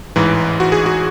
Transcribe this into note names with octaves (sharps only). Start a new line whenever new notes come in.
A1 G#2 E3
F#4
G#4
F#4